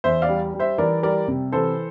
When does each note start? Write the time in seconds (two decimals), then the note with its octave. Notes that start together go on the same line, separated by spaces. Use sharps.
0.04 E2 C5 E5
0.22 D5 F5
0.29 G3
0.54 G3
0.59 C5 E5
0.78 E3 A#4 D5
1.03 G3 A#4 D5
1.28 C3
1.52 E3 A4 C5